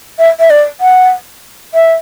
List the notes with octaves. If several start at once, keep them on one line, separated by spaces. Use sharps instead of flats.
E5
E5
D5
F#5
E5